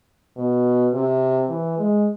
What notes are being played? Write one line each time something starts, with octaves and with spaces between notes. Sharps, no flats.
B2
C3
E3
G#3